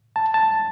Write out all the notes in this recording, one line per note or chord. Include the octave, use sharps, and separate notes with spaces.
A5
A5